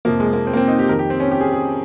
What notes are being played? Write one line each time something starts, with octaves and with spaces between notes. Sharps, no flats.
F2 C3 F3 A#3
G#3
A#3
C4
A#3
C4
D#4
G4
F2 D#3 A#4
G4
C4
C#4
G4
G#4
G#4